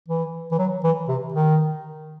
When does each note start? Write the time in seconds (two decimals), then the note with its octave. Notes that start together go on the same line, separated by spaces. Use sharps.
0.08 E3
0.52 E3
0.58 F#3
0.83 E3
1.08 C3
1.33 D#3